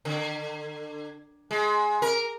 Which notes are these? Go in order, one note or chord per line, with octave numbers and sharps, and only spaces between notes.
D3
G#3
A#4